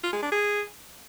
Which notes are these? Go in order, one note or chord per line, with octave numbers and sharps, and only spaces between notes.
F4
G#3
D4
G#4